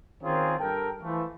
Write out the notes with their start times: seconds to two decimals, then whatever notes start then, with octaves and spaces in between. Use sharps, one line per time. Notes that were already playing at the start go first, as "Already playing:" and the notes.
0.23 D#3 C4 C#4 F4 G#4 A#4
0.59 G2 A4 A#4 G5
1.03 E3 F3 A3